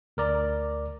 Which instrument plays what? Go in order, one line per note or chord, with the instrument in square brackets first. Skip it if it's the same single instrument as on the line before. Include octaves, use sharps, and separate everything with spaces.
[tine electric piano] D2 A#4 D5 A#5